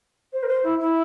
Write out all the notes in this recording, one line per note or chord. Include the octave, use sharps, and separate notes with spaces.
C5
A#4
C5
E4
E4